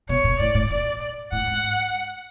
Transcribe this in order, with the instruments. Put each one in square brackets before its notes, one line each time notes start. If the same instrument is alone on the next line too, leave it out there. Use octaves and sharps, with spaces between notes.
[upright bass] B2 [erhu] C#5
[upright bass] A#2
[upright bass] A2 [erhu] D5
[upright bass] A2
[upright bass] A#2 [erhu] D5
[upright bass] A2 [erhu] F#5
[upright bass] G#2